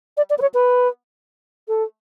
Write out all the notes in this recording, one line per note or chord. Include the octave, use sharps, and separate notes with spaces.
D5
D5
B4
C#5
B4
A4